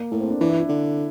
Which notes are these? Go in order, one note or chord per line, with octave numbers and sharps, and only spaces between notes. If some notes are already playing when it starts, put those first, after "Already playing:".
Already playing: A#3
A2 A4
C4
D4
E3 D4
E4
E4
D3